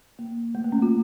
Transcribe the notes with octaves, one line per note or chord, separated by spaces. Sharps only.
A#3
A3
A#3
C#4
F4